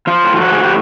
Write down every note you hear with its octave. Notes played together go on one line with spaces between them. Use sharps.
F3 F4
A2
F4
F3 F#4
G#4
A2
G4